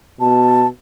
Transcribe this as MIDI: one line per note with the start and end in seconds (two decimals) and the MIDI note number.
0.21 0.67 47
0.21 0.67 81